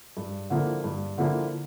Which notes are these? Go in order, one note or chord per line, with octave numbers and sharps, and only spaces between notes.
G2
D3 F3 A#3 E4
G2
D3 F3 A#3 E4